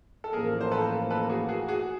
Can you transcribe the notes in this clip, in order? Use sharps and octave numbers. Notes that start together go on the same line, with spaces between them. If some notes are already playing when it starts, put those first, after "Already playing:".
A4
A1 A2 F3 A#3 G#4 A#4
C5
A4 B4
A4 B4
F#4 G#4
F#4 G#4
F#4 G#4